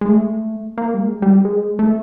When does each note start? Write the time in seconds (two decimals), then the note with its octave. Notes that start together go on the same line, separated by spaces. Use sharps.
0.01 G#3
0.08 A3
0.78 A#3
0.94 G3
0.99 G#3
1.22 G3
1.45 G#3
1.79 A3